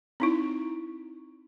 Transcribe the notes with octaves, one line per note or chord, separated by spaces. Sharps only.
C4 D#4 E4